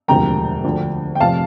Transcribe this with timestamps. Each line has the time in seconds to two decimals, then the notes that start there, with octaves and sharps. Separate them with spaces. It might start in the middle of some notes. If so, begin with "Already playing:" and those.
0.08 E1 D2 C3 F3 G5 A#5
0.64 D2 D3 F3
1.15 G5
1.20 F1 F2 C3 F3 F5 A5